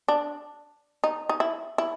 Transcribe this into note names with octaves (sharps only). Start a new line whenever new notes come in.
D4
D#4
D#4
E4
E4